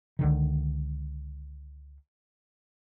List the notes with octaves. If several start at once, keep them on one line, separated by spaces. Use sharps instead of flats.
C#2 D3 D#3